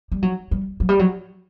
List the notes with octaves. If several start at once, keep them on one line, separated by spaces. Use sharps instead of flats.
G3
F#3
G3
F#3
G3
F#3